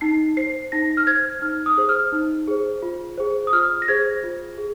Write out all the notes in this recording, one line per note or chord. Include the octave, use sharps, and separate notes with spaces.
D#4 C7
C5 C7
D#4 A#6
F6
C5 G#6
D#4 F6
D#6
G#4 C5
F6
D#4
G#4 C5
F4
G#4 C5
D#6
F4 F6
A#6
G#4 C5 G#6
F4
G#4